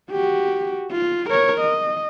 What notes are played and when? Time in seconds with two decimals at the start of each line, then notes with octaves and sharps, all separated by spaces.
0.11 F#4 G4
0.91 F4
1.30 A#4 C#5
1.61 D#5